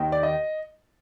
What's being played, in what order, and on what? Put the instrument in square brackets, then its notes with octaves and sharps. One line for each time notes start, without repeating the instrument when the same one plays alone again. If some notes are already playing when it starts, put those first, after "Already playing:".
Already playing: [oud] D#2 D#3
[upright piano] D5
D#5